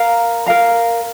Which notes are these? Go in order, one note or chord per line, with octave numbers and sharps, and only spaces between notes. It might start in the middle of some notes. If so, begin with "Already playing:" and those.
Already playing: A#4 F5 A#5
A#4 F5 A#5